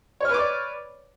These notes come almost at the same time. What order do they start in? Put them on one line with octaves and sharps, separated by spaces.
C#5 F6 B4 D6 D5